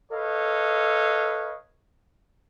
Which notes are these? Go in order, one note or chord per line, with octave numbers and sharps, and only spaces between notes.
A4 B4 C#5 D#5 F5